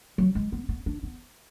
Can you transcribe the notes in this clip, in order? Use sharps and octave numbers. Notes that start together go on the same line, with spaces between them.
F#3
G#3
B3
B3
D4
B3